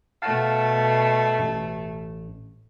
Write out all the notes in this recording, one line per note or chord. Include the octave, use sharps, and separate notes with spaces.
B2 A3 F5 F#5 A5
A1